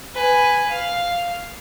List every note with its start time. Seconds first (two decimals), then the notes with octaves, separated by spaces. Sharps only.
0.14 B4 G#5
0.71 F5